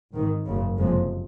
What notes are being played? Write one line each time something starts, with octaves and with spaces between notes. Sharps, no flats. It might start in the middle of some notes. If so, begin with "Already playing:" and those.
G#1 G#2 D#3
F#1 F#2 C#3
F#1 F2 C3 F3 G#3